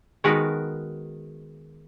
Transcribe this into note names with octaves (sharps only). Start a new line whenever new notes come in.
D#3 G#3 B3 F#4 A#4 B4